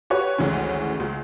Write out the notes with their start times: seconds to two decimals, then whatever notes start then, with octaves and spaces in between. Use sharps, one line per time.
0.10 F#4 G4 B4 C#5
0.38 G#1 D2 E3 G#3 C#4
1.00 C#2